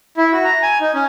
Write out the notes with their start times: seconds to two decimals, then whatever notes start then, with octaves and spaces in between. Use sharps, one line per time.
0.17 E4
0.32 F#4
0.44 A#5
0.62 G#5
0.81 D#4
0.94 C#4